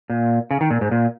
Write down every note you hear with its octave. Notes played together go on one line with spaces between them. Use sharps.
A#2
C#3
D#3
A#2
G#2
A#2